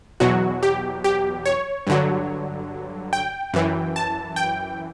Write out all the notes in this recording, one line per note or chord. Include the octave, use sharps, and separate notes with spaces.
E2 B2 F#3 F#4
G4
G4
C#5
G2 D3 F#3
G5
F#2 E3
A5
G5